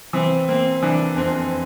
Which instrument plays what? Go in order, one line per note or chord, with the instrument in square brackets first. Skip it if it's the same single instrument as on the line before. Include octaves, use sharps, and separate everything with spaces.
[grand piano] E3 [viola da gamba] C4
[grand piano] A#3 [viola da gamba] C4
[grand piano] E3 [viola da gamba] D4
[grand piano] F2 [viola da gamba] C4